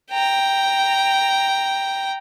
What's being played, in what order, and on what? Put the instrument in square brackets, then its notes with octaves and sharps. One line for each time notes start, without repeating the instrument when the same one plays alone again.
[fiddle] G5 A#5